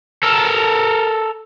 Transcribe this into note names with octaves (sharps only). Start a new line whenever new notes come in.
A4 A#4